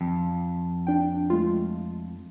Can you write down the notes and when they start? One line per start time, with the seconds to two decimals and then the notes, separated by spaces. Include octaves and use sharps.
0.01 F2
0.87 D4 G5
1.30 G#3 A3 F4